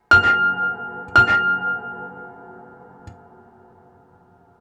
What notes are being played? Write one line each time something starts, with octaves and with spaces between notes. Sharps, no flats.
F6
F6